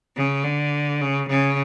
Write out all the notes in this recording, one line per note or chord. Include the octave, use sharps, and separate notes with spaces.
C#3
D3
C#3
C#3